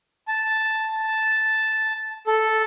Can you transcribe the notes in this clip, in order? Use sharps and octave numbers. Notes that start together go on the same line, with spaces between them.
A5
A4